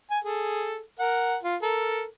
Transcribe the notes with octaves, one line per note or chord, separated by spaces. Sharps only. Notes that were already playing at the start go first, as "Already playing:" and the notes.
G#5
G#4 A4
A#4 F#5
F4
A4 A#4